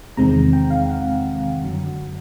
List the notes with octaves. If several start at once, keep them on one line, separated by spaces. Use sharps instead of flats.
E2 C3 D#3 G#3 C4 A#5
G5
F5
F#5
F#2 D3 F#3